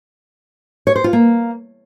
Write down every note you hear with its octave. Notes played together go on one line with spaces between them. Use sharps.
C#5
C5
F4
A#3